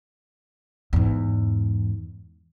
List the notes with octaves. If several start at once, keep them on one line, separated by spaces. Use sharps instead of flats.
E2 G#2